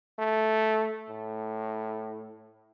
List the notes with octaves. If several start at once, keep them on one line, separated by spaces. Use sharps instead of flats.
A3
A2